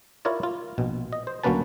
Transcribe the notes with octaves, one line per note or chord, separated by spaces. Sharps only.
E4 F4 A#4 C#5 D5
F4
A#1 B2
D#5
C5
D2 F#3 A#3 C#4 B4 A5